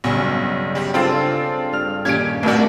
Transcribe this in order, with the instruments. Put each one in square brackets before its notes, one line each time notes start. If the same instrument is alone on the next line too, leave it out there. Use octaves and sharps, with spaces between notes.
[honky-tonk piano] B1 [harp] G2 C#3 F#3
[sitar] G3
[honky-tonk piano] C4 F4 [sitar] D4 [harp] G#4 A4 C5
[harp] G2 F6
[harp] A#2 D#3 G4 [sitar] C#4 [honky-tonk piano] G#6 D7
[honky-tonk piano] C2 [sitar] A#2 F#4 [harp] A3 D4 A#4